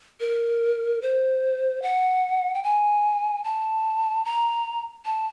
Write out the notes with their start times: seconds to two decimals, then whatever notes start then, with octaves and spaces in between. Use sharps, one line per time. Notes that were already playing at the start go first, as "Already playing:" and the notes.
0.20 A#4
1.02 C5
1.82 F#5
2.54 G5
2.63 G#5
3.44 A5
4.25 A#5
5.05 A5